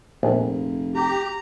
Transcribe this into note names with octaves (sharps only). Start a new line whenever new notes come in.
F1 A#1
G4 A#5